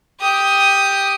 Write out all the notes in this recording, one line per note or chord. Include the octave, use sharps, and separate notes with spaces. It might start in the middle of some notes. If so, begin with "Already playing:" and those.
G4 D#6